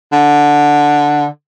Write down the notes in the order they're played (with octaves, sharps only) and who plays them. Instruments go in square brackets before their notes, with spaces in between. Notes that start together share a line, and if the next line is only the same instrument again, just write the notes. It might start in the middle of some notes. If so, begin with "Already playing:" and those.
[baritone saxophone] D3